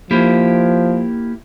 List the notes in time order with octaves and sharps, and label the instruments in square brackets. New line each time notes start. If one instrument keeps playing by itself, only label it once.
[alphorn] F3 [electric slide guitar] A#3 E4 G4